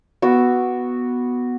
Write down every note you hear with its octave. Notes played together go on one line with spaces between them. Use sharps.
B3 F#4 D6 E6